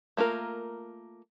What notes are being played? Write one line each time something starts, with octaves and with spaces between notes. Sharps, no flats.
A3 A#3 F4 A#4